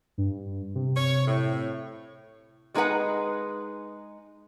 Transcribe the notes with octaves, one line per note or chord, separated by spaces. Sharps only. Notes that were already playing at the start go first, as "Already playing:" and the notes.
G2
C3
C#5
A2
G3 G#3 D#4 G#4 B4 F#5